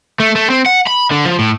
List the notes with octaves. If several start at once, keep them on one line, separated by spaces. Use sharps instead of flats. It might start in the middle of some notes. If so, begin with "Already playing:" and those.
A3
A3
C4
F#5
B5
D3
F3
A2